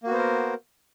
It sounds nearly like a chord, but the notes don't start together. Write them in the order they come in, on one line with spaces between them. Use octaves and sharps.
A#3 F#4 B3 C5 A#4